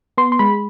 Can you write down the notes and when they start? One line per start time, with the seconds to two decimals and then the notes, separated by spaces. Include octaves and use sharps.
0.18 B3 C6
0.32 C6
0.39 G#3 B5